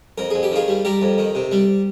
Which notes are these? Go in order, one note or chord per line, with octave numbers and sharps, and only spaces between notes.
F2 A#4
F2 G#4
G4
D#3 F4 G#4
G3
G3 G4 A#4
F2
D#3
C3
G3